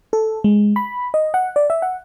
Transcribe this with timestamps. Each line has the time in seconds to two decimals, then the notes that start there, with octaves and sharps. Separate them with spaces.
0.13 A4
0.44 G#3
0.76 B5
1.14 D#5
1.34 F#5
1.56 D5
1.70 E5
1.82 F#5